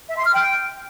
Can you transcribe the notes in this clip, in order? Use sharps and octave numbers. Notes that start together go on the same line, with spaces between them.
E5
C6
F6
G5